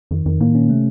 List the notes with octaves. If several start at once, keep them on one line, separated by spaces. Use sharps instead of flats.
F2 D#3
F2 D#3
A2 A#3
A#2 C#4
C3 A3